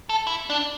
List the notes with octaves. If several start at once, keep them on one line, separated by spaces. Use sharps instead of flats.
A4
E4
D4